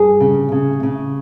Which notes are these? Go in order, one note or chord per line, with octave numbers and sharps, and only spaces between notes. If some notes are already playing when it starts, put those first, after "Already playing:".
Already playing: G2 G#4
C#3
C#3
C#3